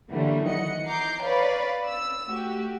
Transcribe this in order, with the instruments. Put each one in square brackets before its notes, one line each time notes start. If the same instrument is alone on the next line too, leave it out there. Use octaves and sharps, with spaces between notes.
[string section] D3 E3 F#3 G3 A3 A#3
D#3 E3 D#5 F#5 C#7
A#5 D6 G6 C7
B4 C#5 D5 F5 B5
E6
A3 F#4 G4